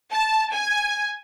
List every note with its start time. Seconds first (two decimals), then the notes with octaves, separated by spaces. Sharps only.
0.12 A5
0.54 G#5